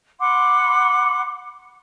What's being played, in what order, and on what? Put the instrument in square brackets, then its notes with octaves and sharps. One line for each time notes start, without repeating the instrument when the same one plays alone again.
[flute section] F#5 B5 C6 D6